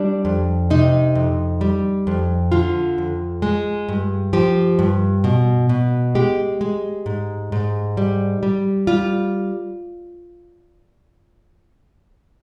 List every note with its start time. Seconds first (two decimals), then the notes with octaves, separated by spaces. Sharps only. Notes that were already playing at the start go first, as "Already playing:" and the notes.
Already playing: G3 D4
0.25 F2
0.70 C3 D#4
1.15 F2
1.61 G3
2.07 F2
2.52 D3 F4
2.98 F2
3.42 G#3
3.89 G2
4.33 F3 G4
4.79 G2
5.24 B2
5.69 B2
6.15 G#3 G4
6.61 G#3
7.06 G#2
7.52 G#2
7.97 G3
8.43 G3
8.87 G3 F4